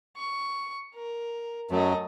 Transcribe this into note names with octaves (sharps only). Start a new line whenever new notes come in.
C#6
A#4
F#2 F#3 A3 D#5